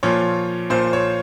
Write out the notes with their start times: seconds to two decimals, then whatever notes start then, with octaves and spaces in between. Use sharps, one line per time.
0.03 A#2 F3 C#5
0.70 A#2 F3 C5
0.93 C#5